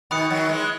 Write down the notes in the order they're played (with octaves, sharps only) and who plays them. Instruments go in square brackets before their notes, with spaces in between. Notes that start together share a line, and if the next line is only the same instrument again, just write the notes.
[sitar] B2 D#3 [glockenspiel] B5 D#6 F#6 C#7
[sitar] D#3 F#3
E3 G#3